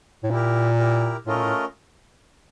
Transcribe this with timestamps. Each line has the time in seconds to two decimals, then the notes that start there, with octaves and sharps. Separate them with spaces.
0.23 A2
0.31 A#2 E4 G4 A#4
0.78 E4 G4 A#4
1.26 A2 A3 C#4 F4 A#4 D#5
1.35 A#2
1.43 A2